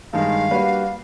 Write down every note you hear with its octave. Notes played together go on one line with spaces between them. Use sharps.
G2 D#3 G#3 F5
G3 A#3 D4 F#4 B4